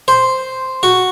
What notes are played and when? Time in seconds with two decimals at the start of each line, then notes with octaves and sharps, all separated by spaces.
0.08 C5
0.83 F#4